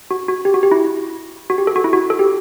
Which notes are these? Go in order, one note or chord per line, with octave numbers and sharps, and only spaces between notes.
F#4
F#4
G4
F#4
G4
E4
F#4
G4
A4
F#4
E4
F#4
A4
G4